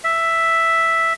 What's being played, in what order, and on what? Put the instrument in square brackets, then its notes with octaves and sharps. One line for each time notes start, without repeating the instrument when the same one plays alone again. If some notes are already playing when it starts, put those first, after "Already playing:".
[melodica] E5